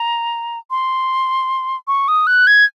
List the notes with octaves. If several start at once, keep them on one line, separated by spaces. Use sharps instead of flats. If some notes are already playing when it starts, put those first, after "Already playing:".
Already playing: A#5
C6
C#6
D#6
F#6
G#6